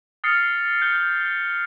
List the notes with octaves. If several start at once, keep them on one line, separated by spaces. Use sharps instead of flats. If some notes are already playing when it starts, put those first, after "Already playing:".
D#6 F6 A6 C7 C#7
G6 C#7 G7